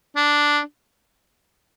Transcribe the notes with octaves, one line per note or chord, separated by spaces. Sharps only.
D4